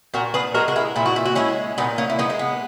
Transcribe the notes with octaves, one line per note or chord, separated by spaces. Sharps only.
A#2 F#4 A#4
G#4 B4
G#3 F#4 A#4
F#4
E4 G#4
A#2 E4
F#4
E4
F#4
G#3 C#4 E4
A#2 B3 D#4
A#3 C#4
E4
G#3 B3 D#4
A#3
B3